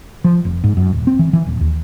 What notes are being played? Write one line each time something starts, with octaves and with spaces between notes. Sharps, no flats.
F3
F1
G#2
F#2
D#1
C4
E3
E3
D#1
D#2